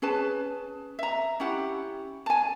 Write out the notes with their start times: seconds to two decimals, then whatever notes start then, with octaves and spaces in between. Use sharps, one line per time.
0.02 C#4 G#4 B4 A5
0.99 E5 A#5
1.40 C#4 E4 G4 F#5
2.26 G#5 A5